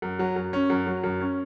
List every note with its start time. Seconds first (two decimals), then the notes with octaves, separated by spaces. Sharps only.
0.02 F#2
0.19 F#3
0.36 F#2
0.53 C#4
0.70 F#2
0.86 F#3
1.03 F#2
1.20 C#4